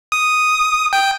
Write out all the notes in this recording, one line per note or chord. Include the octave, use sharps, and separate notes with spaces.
D#6
G5